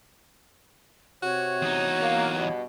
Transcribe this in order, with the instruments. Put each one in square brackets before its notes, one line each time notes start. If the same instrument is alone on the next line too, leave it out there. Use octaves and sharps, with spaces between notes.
[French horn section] C3 [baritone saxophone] F#4 [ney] C#5
[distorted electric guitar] E2 D#4
[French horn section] A#3
G2 B2